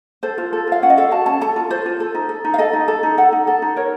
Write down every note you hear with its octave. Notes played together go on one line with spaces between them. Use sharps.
A4 C5
F4
A4
F4 F5
C#4 F#5
D#5
A4 F5
F#4 A5
C#4 A5
A4 A5
F4
A4 C5
F4
A4
D#4
A4
D#4
F5
A4 D#5
D#4
A4
D#4
A4 F#5
D#4
A4
D#4
A#4 C#5